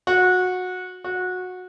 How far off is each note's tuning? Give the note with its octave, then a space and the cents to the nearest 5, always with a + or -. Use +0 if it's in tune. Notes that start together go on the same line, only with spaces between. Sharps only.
F#4 -20
F#4 -20